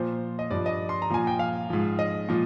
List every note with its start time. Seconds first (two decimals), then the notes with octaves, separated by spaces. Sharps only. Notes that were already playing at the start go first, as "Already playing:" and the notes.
Already playing: A#2 F3 C5
0.39 D#5
0.51 G2 F3 D5
0.66 D#5
0.89 C6
1.02 A#5
1.10 A#2 F3 G#5
1.27 G5
1.39 F5
1.70 G#2 F3
1.99 D#5
2.29 A#2 F3